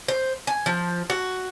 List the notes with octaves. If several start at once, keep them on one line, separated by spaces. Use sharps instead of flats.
C5
G#5
F3
F#4